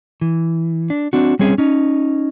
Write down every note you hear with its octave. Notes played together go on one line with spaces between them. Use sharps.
E3
D4
C4 D4 F#4
G3 C4 C#4 G#4
C#4 D#4